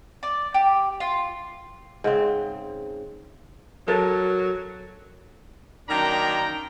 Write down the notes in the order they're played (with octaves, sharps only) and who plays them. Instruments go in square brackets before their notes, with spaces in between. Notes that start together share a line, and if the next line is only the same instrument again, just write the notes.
[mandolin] D5
G4
F4
[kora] G#2 C#3 C4
[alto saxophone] F#3 [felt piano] A4 A#4 A6
[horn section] F#2 D#3 A#3 D4 G5 A#5